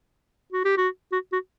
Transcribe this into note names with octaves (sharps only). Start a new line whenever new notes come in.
F#4
G4
F#4
F#4
F#4